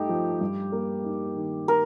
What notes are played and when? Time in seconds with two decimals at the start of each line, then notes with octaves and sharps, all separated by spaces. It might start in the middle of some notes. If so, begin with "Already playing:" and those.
Already playing: G2 A3 D#4 G4
0.09 F3
0.41 G2
0.72 A#3
1.04 D#4
1.36 D#3
1.68 A#4